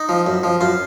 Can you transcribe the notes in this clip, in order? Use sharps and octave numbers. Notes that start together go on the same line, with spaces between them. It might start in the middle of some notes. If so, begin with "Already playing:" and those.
Already playing: D#4
F3
F#2
F3
F#2 F4